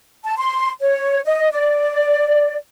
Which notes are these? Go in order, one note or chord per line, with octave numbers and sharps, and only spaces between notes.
A5
C6
C#5
D#5
D5